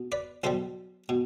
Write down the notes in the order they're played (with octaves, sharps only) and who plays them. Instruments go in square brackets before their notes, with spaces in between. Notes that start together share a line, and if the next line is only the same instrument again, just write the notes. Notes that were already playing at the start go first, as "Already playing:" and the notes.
Already playing: [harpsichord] B2
B4 D5
B1 B2 G3 A4 C5
B2